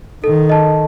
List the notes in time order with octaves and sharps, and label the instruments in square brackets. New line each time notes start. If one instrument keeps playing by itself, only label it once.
[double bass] D#3 [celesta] A4
[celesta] D#5 A5